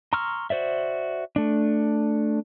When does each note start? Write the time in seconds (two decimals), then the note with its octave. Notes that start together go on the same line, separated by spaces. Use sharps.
0.13 A#5 C6 C#6 E6 F6
0.50 F#4 C5 D5 E5
1.36 A3 D4